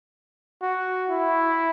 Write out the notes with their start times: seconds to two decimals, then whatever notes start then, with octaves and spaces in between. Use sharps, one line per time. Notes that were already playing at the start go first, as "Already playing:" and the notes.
0.62 F#4
1.10 E4